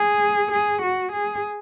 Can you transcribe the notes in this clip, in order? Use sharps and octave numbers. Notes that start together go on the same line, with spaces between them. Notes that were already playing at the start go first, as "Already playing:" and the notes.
Already playing: G#4
G#4
F#4
G#4